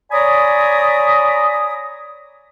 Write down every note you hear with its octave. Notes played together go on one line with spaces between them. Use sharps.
C#5 D5 G#5 A#5 B5 D#6